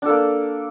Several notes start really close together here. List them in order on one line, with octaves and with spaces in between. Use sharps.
D4 A4 A#3